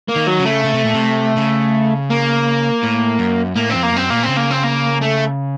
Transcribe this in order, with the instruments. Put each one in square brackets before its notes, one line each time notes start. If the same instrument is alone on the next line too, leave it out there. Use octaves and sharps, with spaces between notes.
[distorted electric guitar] A#3
[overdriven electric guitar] D#3
[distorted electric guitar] F#3
[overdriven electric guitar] C#3
[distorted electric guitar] A3
[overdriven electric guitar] C#3
C3
A#2
C3
C#3
[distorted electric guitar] A#3
[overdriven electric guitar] A2
F#2
[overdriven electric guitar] A2 [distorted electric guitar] A#3
[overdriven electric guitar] F2 [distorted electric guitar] C4
[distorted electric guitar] A#3
[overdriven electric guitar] F#2 [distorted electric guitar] C4
[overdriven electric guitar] A#2 [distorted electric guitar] A#3
[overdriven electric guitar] C#3 [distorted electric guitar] C4
[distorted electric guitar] A#3
C4
A#3
A3